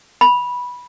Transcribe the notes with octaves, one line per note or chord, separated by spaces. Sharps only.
B5